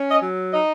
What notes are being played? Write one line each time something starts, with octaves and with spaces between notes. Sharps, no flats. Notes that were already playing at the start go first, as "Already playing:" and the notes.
Already playing: C#4
D#5
F#3
D#4 D#5